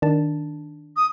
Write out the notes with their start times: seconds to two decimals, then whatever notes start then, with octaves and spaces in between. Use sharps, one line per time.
0.02 D#3 D4 A5
0.97 D#6